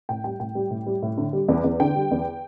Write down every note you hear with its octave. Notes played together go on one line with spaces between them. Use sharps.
A2 G5
G3 G5
A2 G5
G3
A2
G3
A2
D3
G3
E2
E2
D3 G5
G3
E2